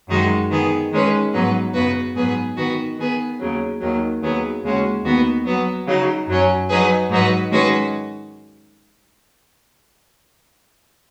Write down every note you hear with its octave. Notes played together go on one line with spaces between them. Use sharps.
F#2 D#3 G#3 D#4 F#4
D#3 B3 G#4
D#3 G#3 C#4 B4
G#2 F#3 B3 D#4 B4
F#2 C#3 B3 F#4 B4
G#2 F#3 B3 G#4 B4
D#3 B3 F#4 B4
D#3 B3 G#4 B4
D#2 C#3 F#3
D#2 D#3 F#3 D#4
D#2 D#3 F#3 B3 G#4
D#2 C#3 G#3 C#4 F#4
D#2 D#3 B3 F#4 B4
F#3 B3 F#4
C#3 F#3 D#4
F#2 F#3 C#4
F#3 D#4 G#4 B4
G#2 F#3 D#4 F#4 B4
D#3 G#3 C#4 F#4 B4